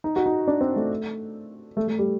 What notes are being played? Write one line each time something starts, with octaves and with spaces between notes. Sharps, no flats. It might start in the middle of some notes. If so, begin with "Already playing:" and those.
D#4
F#4
D#4
D4
C4
A3
A3
A3
G3